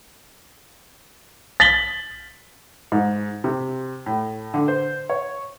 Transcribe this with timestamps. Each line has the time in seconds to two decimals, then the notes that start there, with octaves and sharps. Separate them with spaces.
1.60 A6 B6 F#7 G7
2.92 G#2
3.44 C3
4.06 A2
4.54 D3
4.68 C5
5.10 C#5